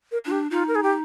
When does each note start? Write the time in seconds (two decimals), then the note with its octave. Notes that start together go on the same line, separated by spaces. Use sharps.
0.12 A#4
0.25 D4 F4
0.31 G4
0.51 D#4 F4
0.68 A#4
0.75 G#4
0.83 G4